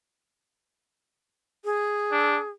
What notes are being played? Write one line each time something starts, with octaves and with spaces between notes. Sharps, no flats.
G#4
D4